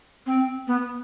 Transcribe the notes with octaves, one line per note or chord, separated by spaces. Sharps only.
C4
B3